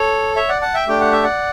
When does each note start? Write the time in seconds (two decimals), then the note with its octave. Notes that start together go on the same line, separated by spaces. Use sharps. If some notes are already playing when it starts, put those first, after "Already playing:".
Already playing: A4 C#5
0.36 C#5 E5
0.49 D5 F#5
0.61 F#5 A5
0.74 E5 G5
0.88 A3 D4 G4 G5
1.00 F#5
1.12 E5
1.24 D5 F#5